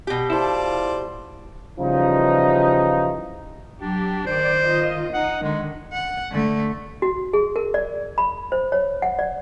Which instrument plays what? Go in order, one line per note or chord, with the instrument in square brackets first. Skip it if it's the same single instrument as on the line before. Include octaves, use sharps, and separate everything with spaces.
[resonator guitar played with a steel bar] B2 G4
[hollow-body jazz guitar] E4 A4 [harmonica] F4 C5 D5
[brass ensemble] C#3 E3 F3 G3 D#4
[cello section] F#3 G4 [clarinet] D4
[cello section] D#3 D5 [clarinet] C5
[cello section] D#3 F4 D#5
[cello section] D#4 [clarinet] F#5
[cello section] D3 D#3 [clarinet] G#3
[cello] F#5
D3 A3
[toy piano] F#4
G#4
A#4
D5
B5
C5
C#5
F#5
D5